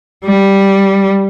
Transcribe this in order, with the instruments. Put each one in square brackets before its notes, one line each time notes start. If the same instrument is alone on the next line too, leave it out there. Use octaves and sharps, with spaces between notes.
[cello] G3